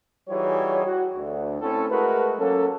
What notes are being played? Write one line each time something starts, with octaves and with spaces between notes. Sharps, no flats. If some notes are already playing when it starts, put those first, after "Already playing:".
E3 G3 D#4 F#4 G#4 C#5
F#4
D2
A3 C4 C#4 E4 A4
G#3 A3 F#4 G#4 A#4 B4
F#3 A#3 C#4 A4